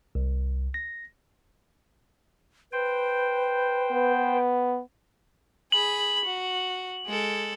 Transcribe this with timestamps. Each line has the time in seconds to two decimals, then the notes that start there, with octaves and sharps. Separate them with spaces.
0.15 C2
0.74 A#6
2.72 B4 C5 G5
3.92 B3
5.72 G#4 B5 F#7
6.25 F#4
7.06 G#3 A4